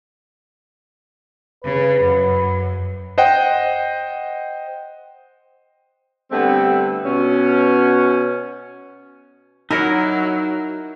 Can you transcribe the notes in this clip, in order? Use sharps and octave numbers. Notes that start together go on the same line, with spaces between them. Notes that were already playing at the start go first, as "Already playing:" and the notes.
C#3 B4
F#2
C5 D#5 F#5 G5
D3 G3 A3 B3 C4
B2 C#4
F#3 D#4 E4 A#4 D#5 F#5